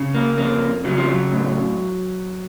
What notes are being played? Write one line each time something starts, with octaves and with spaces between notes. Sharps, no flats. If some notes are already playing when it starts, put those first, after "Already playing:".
Already playing: C#3
A#3
F2 A#3
C#3 F#3
F3
F#3
A2